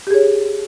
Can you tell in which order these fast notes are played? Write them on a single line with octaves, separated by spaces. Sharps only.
G4 G#4 C#5